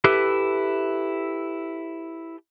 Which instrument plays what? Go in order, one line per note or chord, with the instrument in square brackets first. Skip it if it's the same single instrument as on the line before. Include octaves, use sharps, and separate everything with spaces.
[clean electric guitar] E4 G4 A4 B4 E5